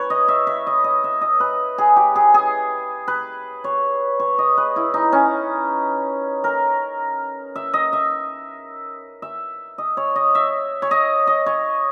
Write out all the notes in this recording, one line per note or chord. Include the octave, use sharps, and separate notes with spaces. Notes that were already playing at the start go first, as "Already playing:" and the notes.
Already playing: B4 C#5
D#5
E5
E5
D#5
D#5
E5
D#5
B4
G#4
G4
G#4
G#4
B4
C#5
C#5
D#5
B4
E4
D#4
C#4
A#4
E5
D#5
E5
E5
D#5
C#5
D#5
E5
C#5
D#5
D#5
C#5